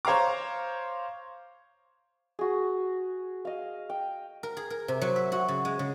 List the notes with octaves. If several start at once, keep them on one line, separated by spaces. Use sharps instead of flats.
C5 C#5 F5 A#5 D6
F#4 G#4
D#5 F5
G5
A#4
G#4
A#4
C3
F#3
E5
F#4
C#3
G#3
C#3